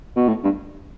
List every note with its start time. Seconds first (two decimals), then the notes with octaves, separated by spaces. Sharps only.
0.16 B2
0.28 A2
0.44 G2